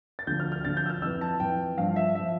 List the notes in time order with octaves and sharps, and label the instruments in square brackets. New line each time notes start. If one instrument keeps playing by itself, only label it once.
[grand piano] A6
D2 D3 F3 G6
F6
F6
D2 D3 F3 A6
G6
E6
F6
F2 E3 E6
A5
F2 E3 G5
G2 F3 F5
E5
F3 E5